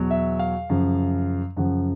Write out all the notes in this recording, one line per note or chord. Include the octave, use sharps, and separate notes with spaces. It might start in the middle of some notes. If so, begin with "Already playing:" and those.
Already playing: E2 B2 F#3
E5
F5
F#2 C#3 F3
F#2 C#3 F3 F#5